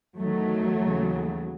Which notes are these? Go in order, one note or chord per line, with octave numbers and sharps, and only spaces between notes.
E2 D#3 F#3 A3
D#2 C#3 E3